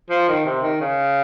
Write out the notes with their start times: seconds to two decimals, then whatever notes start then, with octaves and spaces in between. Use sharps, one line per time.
0.10 F3
0.28 D#3
0.46 C3
0.62 D#3
0.81 C#3